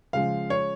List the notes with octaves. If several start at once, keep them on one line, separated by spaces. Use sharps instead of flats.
C#3 F3 G#3 F5
C#5